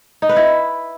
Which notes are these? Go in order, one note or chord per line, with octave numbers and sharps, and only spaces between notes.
D#4
B4
E4